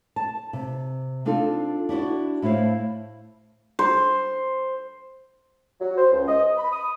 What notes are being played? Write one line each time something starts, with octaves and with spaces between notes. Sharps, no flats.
A5
C3
C4 D4 D#4 F4 A4
D4 E4 F#4 D5
A2 A3 E4 C5 F5
C5
F#3
C5
C#2
D#5
B5
D#6